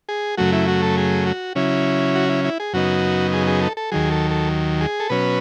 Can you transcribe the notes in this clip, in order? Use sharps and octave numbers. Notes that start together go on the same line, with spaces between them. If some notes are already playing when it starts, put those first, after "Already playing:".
G#4
F#2 C#3 F#3 A3 F#4
E4
F#4
A4
G#4
F#4
C#3 F#3 C#4 E4
F#4
E4
E4
G#4
F#2 C#3 F#3 B3 D#4 F#4
G#4
G#4
A4
A4
D#2 D#3 F#3 G#4
A4
A4
G#4
A4
B2 F#3 C#4 B4